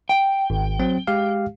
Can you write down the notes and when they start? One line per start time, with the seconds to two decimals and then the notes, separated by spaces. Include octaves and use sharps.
0.09 G5
0.50 G#1
0.79 F#3 C4
1.07 G#3 G4 F5